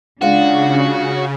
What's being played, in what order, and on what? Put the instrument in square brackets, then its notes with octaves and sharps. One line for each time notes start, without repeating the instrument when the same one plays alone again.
[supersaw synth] C#3 [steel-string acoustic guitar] G#3 F4 D5 [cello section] D4 [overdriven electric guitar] F#4